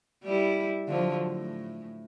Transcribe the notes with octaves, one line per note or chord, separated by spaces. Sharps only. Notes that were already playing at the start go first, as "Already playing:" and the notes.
G3 E4
D3 F3 F#3
A2